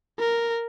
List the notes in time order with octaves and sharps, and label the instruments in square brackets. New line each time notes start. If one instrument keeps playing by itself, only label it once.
[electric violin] A#4